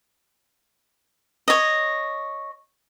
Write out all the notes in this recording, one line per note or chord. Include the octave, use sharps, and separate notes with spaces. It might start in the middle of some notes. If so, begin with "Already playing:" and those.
C#5 D#5